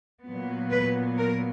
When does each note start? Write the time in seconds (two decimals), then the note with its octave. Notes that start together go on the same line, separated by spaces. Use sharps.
0.25 A#2 F#3 B3
0.70 B4
1.17 A#4